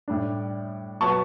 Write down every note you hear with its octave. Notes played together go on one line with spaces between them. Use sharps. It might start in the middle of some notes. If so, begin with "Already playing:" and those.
A2 G3 D4
B2 F#3 B3 A5 C#6